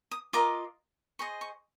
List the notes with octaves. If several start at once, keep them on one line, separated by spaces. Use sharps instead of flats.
D#6
F4 A#4 D#5 D6
G#4 C5 D#5 C#6
C#6